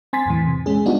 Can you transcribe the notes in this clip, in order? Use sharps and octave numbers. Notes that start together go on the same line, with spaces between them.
C4 G#5 C6 A6 B6
E2 A2 E3
C3
G#3 C#4 G#4
G3 B3 D4 D#4 F4 F#4